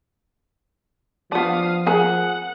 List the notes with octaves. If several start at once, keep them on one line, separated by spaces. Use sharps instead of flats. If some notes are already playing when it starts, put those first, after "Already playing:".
F3 B3 D4 F5 D#6
C4 G#4 A#4 F#5